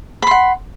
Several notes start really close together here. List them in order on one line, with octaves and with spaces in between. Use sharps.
B5 C6 F#5